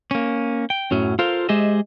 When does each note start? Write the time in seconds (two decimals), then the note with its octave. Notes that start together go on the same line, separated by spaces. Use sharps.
0.11 A#3 C#4
0.70 G5
0.91 F#2 A2 F#3 C#4
1.19 F4 A4 A#4 C5 F5
1.49 G#3 G4 G#4 C5 D#5 E5